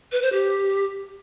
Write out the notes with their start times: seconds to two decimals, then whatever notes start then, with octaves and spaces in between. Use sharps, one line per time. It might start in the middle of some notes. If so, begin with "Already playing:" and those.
0.12 B4
0.22 C5
0.32 G4